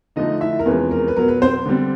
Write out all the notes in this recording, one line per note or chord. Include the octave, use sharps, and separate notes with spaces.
D3 F3 A3 D#4 D#5
E4 E5
A#4
E2 C3 F3 G#3 C#4 B4
A#4
B4
B2 F#3 B3 A#4
B4
C4 C5
D3 G3 C4